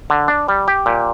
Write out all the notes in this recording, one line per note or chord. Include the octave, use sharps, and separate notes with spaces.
D3
D4
G3
G4
A#2